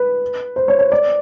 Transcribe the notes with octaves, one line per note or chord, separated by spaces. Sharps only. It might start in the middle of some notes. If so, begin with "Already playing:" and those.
Already playing: B4
C5
C#5
C#5
D5